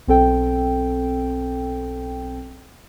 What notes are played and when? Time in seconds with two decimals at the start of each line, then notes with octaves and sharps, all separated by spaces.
0.08 B1 C4 A4 G5